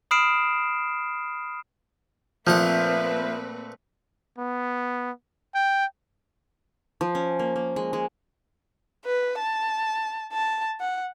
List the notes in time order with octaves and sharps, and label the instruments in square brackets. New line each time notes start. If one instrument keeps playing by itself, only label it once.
[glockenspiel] B5 D#6 F6 C7 D7 E7
[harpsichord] A#2 A3 F#5 [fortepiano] F3 [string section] A#3 C4 B4 [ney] E5
[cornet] B3
G5
[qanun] F3
C#4
A#3
A#3
G#3
G#3
[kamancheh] B4
A5
A5
F#5